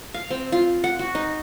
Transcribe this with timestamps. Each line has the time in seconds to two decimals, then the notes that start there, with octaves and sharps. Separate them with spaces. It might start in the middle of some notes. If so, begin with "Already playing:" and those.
0.14 F5
0.31 C4
0.52 F4
0.84 F#5
0.99 F#4
1.15 D#4